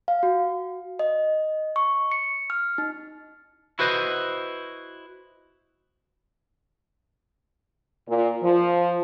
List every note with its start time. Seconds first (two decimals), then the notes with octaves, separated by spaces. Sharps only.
0.08 F5
0.23 F#4
0.99 D#5
1.76 C#6
2.12 C#7
2.50 F6
2.78 D#4
3.79 E4 F#4 B4 C5 D#5
8.07 A#2
8.43 F3